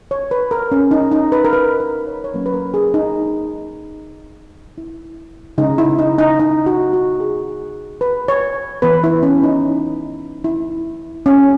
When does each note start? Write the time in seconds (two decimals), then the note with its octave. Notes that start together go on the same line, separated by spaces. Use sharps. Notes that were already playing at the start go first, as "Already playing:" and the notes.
0.11 C#5
0.31 B4
0.51 A#4
0.72 C#4
0.91 D#4
1.11 D#4
1.32 B4
1.45 A#4
1.53 B4
1.80 B4
2.07 C#5
2.24 C#5
2.33 F#3 A#3 C#4 B4
2.46 B4
2.54 A#4
2.74 G#4
2.94 D#4
4.78 E4
5.58 C#3 G#3 C#4 D#4
5.78 E4
5.99 D#4
6.18 D#4
6.40 D#4
6.66 F#4
6.93 F#4
7.20 G#4
8.01 B4
8.28 C#5
8.82 E3 B3 B4
9.04 E4
9.23 C#4
9.43 D#4
10.44 E4
11.26 C#4